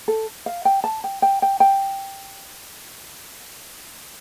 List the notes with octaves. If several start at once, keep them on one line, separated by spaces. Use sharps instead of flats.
A4
F5
G5
A5
G5
G5
G5
G5